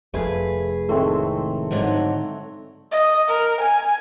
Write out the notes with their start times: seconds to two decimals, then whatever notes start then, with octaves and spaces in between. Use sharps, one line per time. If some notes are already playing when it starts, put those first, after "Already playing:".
0.14 F1 F2 A3 G#4 B4
0.89 A2 D#3 G#3 A3 C4
1.71 G#2 D3 F#3
2.92 D#5
3.28 A#4
3.60 G#5